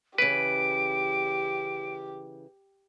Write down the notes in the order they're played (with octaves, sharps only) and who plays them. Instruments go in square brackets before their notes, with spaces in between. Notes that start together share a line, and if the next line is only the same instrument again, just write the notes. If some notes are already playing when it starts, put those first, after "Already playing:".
[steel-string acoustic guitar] C#3 E3 [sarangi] G4 [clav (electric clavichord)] B4 [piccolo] D7